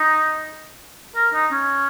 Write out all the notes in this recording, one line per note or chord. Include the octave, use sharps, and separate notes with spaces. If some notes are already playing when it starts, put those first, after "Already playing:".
Already playing: D#4
A#4
D#4
C#4